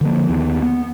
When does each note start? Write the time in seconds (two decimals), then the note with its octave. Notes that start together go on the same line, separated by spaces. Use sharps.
0.01 D3 F3 A#3
0.28 D#2 B3
0.62 B3